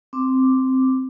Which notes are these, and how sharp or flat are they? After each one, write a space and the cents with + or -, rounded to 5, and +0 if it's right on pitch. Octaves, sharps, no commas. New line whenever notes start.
C4 +0 D6 +0